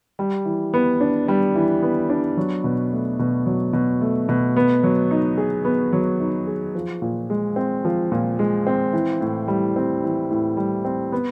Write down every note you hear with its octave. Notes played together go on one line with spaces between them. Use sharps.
G3
E3
B3
D4
G3
E3
B3
D4
F#3
B2
A3
B2
F#3
B2
A3
B2
B3
F#3
D#4
G#4
B3
F#3
D#4
G#4
F3
A#2
G#3
C4
F3
A#2
G#3
C4
E3
A2
G3
C4
E3
A2
G3
C4
B3